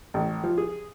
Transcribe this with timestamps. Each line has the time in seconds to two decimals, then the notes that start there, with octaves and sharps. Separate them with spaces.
0.14 A1
0.44 F3
0.58 G#4